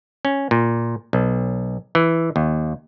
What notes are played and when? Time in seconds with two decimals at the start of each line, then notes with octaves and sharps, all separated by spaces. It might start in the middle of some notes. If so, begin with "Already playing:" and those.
0.25 C#4
0.51 A#2
1.13 B1
1.95 E3
2.36 D#2